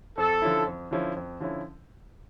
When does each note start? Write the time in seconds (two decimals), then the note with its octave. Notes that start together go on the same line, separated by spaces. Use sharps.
0.18 F2 A4
0.42 D3 F3 C#4 E4
0.66 F2
0.91 D3 F3 C#4 E4
1.16 F2
1.40 D3 F3 C#4 E4